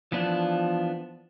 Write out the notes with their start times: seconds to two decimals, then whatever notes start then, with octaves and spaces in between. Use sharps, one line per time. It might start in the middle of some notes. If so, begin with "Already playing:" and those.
0.12 E3 F3 B3 D4